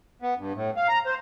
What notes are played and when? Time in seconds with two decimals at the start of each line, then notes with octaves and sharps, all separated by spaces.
0.22 B3
0.38 G2
0.55 A2
0.77 F5
0.88 A#5
1.06 C5